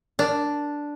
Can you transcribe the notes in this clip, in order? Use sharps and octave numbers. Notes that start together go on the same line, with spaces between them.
D4